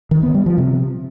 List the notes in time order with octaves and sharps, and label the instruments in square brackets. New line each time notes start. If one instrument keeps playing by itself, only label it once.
[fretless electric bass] D#3
B3
G3
F3
C3